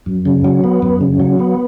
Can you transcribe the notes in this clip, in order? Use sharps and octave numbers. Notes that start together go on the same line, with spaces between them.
F#2
C#3
F#3
B3
F#2
C#3
F#3
B3